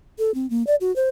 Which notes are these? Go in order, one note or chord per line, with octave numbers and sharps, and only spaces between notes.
A4
C4
A#3
D5
F#4
C5